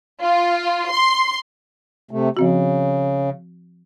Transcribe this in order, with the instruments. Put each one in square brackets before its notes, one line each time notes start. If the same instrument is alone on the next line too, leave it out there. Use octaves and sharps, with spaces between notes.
[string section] F4
C6
[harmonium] C3 A3
[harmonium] C#3 [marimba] F3 C4 F#4